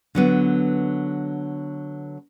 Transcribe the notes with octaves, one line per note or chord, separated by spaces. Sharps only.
D3 F#3 B3